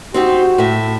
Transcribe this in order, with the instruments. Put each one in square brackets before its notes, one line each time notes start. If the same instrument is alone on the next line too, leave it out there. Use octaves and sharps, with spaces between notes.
[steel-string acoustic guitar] C4 D#4 G4 [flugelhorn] F#4
[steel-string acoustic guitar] A2 E5